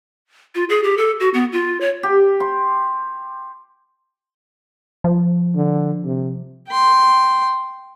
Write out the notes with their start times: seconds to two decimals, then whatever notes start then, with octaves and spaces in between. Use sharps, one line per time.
0.55 F4
0.69 G#4
0.83 G4
0.97 A4
1.20 F#4
1.34 B3
1.52 F4
1.81 C#5
2.03 G4
2.40 C6
5.04 F3
5.56 D3
6.05 C3
6.68 G5 C6